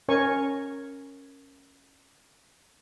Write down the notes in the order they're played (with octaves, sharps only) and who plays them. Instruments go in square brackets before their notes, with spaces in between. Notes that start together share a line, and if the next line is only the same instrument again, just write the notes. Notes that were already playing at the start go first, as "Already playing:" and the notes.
[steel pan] C#4 A#4 C#5 G#5 C#6